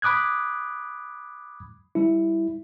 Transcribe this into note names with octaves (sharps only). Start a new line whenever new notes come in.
B5 D6 D#6 F#6 G#6
G3 E4